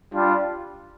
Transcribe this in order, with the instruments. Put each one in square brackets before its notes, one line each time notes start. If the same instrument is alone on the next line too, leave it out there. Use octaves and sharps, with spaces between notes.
[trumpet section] G3 D4 F4